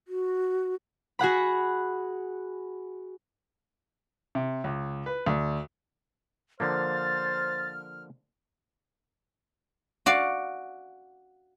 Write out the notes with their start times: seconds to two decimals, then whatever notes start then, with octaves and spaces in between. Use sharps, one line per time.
0.08 F#4
1.19 F#4 G#4 F#5 B5
4.35 C3
4.64 C#2
5.06 B4
5.26 D2
6.60 D3 F3 A#3 C5 F6 A6
10.06 F#4 D5 F5